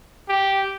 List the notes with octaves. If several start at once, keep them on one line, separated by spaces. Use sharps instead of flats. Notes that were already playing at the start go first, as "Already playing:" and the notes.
G4